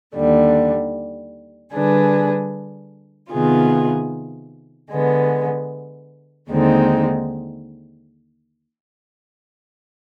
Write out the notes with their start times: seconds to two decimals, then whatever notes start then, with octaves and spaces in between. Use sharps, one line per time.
0.15 D#2 D3 G3
1.73 D3 G3 D4 G#4 B4
3.31 C3 D#3 B3 F4 G#4
4.91 D3 G#3 B3
6.48 D#2 D3 G#3 C4 D#4